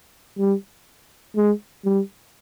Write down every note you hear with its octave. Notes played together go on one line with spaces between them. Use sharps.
G3
G#3
G3